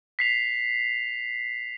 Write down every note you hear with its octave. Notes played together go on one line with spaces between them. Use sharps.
B6 C7 F7